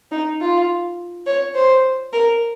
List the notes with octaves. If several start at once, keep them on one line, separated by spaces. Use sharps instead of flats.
D#4
F4
C#5
C5
A#4